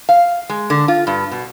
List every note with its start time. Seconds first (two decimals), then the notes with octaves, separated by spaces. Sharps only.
0.09 F5
0.49 G#3
0.70 D3
0.88 F4
1.07 G2
1.31 B2